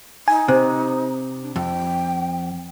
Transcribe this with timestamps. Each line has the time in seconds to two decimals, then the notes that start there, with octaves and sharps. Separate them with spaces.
0.28 D#4 G#5
0.48 C3 C5
1.42 D4
1.56 F2 G5